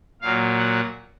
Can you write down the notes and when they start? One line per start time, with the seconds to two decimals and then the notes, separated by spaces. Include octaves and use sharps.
0.21 A#2 F#3 F5
0.58 F#5